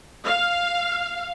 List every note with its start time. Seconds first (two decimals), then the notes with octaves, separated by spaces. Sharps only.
0.24 F5